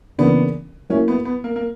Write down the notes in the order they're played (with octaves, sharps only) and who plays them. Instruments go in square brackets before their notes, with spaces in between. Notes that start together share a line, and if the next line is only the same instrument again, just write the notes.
[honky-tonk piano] C#3 E3 A#3 D4 A#4 [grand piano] B3
[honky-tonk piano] F#3 A#3 E4 [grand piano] C#4
[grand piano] B3
B3
A#3
A#3